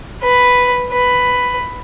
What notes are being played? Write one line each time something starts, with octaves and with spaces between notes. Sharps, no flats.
B4
B4